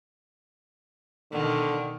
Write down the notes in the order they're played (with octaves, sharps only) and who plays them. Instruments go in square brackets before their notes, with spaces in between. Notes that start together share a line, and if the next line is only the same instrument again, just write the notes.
[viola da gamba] B2 D#3 [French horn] D3